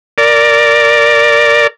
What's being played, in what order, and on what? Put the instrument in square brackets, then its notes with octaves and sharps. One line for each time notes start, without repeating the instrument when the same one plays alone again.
[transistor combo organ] A#4 D5